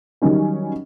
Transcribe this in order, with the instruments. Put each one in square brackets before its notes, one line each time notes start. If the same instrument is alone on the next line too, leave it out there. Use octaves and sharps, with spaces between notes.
[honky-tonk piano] D#3 F#3 G3 C#4 D#4